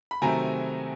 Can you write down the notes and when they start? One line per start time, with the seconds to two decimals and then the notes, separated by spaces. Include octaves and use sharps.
0.11 B5
0.22 C3 D#3 F#3 A3 C4 G#5 A#5